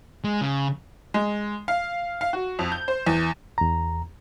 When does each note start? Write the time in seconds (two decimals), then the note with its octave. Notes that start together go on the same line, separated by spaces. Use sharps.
0.24 G#3
0.41 C#3
1.14 G#3
1.68 F5
2.21 F5
2.33 F#4
2.59 F2
2.72 G6
2.88 C5
3.06 E2
3.58 E2 A#5